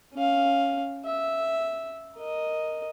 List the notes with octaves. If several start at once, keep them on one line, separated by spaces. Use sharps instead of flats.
C#4 F5
E5
A#4 D#5